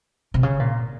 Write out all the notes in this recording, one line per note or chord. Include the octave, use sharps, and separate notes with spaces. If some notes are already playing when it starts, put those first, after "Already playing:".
C3
C#3
A#2